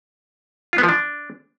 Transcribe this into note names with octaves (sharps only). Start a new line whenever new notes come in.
F4
B3
F3
D4